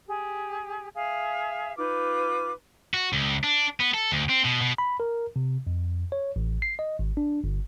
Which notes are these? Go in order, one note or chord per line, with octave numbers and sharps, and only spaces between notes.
G4 G#4
G#4 E5 F5
D#4 F4 B4 D6
F#4
C#2
D4
B3
A4
D2
C4
B2
B2
B5
A#4
C3
F2
C#5
A1
C7
D#5
G#1
D4
G1